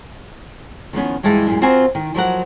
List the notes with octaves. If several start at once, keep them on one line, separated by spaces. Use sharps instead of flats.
D#3 F3 B3 C#4
G2 E3 G#3 F4 A5
F#2 A#2 G#3
C4 F4 F#4 A#4 C5 G#5
D#3
F3 F#3 A#4 F#5